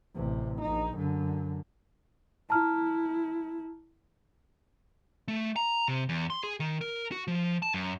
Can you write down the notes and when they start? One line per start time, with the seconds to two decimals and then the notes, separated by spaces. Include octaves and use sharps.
0.15 A1 C3
0.62 A#1 D#4
0.96 F#2 D3
2.50 E4 A5 A#5 F6
5.28 A3
5.56 A#5
5.88 C3
6.09 E2
6.30 C6
6.43 G#4
6.60 D#3
6.81 A#4
7.12 F#4
7.27 F3
7.62 A5
7.74 F#2